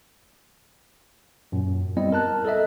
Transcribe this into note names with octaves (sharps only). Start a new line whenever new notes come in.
F#2 A#2
G3 B3 C4 E4 D#5
A#4 A5 F#6
A4 A#4 D#5 E5